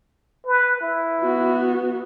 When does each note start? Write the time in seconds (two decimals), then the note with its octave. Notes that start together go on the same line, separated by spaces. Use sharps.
0.46 B4
0.81 E4
1.22 B3 F#4